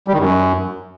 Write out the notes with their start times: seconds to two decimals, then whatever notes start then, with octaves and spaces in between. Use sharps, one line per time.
0.08 G3
0.13 D#3
0.19 F#2